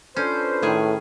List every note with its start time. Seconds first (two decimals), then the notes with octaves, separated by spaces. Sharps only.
0.16 C#4 D4 F4 A4 B4 C5
0.62 A2 D#3 G#4